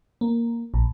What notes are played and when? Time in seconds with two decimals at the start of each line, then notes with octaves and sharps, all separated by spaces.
0.21 A#3
0.74 A#1